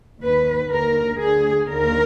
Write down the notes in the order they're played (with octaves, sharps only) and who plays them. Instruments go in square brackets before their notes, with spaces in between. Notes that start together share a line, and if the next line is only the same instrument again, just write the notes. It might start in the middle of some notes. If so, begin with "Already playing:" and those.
[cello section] D#2 D#3 B4
D#2 D3 A#4
D2 D3 G#4
D#2 D3 A#4